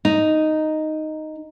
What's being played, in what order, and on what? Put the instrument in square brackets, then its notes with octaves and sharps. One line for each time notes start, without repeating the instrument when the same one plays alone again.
[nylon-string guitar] D#4